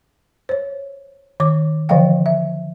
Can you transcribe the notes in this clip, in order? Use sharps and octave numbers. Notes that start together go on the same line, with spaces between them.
C5 C#5
D#3 D6
D3 E3 F3 D#5 F5 G5
E5